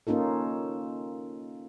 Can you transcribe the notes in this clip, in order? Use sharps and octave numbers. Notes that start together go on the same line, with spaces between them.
A#3 C#4 D#4 F4 A4